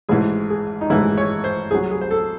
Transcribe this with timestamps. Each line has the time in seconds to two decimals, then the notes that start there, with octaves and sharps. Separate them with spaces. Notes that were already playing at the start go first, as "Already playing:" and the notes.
0.09 A1 G#2 E3 G#3 G#4
0.50 G#4
0.81 D#4
0.90 A1 G#2 E3 G#3 E4
1.18 C#5
1.44 C5
1.71 C2 C3 F#3 G#4
1.91 G#4
2.01 C5
2.11 A4